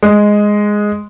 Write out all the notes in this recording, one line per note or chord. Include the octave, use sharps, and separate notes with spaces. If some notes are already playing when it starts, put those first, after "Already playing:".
G#3